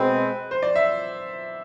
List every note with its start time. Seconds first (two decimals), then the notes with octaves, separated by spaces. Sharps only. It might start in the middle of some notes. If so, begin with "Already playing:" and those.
Already playing: B2 G#3 C4 B4
0.51 C5
0.62 D5
0.75 E5